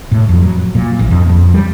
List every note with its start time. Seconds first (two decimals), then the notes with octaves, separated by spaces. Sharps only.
0.12 A2
0.29 F2
0.42 F#3
0.75 A#2
0.99 A1
1.11 F2
1.29 F2
1.54 G3